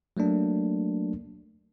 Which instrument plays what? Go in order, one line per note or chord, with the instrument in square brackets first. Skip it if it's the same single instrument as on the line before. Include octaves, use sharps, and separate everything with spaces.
[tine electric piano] F#3 A3 A#3 D4